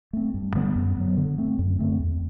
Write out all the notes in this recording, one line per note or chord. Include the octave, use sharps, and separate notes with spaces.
A3 C4
G2
D3 G3 B3
F#2
F#3 B3
D3
A3 C4
F#2
D3 A3 C4
E2